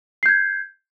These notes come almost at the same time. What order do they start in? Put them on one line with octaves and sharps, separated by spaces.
C7 G6 G#6